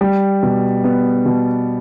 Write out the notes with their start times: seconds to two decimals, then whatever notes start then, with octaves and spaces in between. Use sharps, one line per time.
0.01 G3
0.43 B2
0.84 B3
1.26 B2